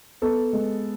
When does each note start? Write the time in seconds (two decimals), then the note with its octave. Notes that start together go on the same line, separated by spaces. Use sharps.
0.22 B3 A4
0.53 G#3